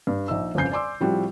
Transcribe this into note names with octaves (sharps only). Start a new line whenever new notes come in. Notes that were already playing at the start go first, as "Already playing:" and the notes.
G2
A#1 D#4 E5 E6
G1 F2 C#3 G#5 G6 C7
D5 G#5 C6 D6 E6
A2 F3 G3 C4 F#4